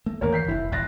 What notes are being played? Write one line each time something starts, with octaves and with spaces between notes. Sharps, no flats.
A3 A#3
G#1 E2 E3 A#3 A#4 C#5
G6 B6 C7
F1 E4
E1 A1 F#6 A6 A#6